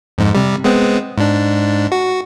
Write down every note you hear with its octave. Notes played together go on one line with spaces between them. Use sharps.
F2 G#2
C3 G3
G#3 B3 C4
G#2 D4
F#4